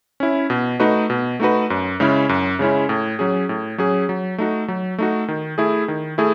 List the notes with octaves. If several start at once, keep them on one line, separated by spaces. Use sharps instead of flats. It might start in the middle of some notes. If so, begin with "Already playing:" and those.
C#4 E4
B2
A3 D#4 F#4 B4
B2
A3 D#4 F#4 B4
F#2
C#3 G#3 C#4 E4
F#2
C#3 G#3 C#4 E4
A2
F#3 C#4 G#4
A2
F#3 C#4 G#4
F#3
A3 D#4 F#4
F#3
A3 D#4 F#4
D#3
A3 E4 G#4
D#3
A3 E4 G#4